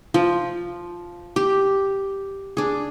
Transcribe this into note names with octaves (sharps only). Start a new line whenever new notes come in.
F3
G4
D4 G#4